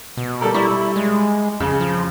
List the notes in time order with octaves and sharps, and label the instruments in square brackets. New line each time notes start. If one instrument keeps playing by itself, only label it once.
[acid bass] B2
[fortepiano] G3 A4 A#4
[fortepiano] G3 B5 C#6 [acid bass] E4
[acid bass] G#3
[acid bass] F2 [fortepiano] C#3
[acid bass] F3